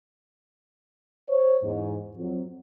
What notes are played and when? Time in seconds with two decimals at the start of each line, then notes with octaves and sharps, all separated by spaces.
1.29 C5 C#5
1.62 E2 G#2
2.16 F2 F#3